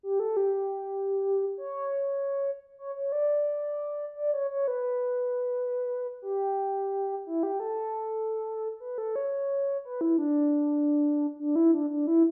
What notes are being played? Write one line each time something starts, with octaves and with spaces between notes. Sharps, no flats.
G4
A4
G4
C#5
C#5
C#5
D5
D5
C#5
C#5
B4
G4
E4
G4
A4
B4
A4
C#5
B4
E4
D4
D4
E4
D4
D4
E4